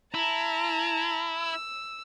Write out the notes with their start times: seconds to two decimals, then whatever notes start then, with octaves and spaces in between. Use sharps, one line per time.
0.14 E4 A5 A#5
1.37 E6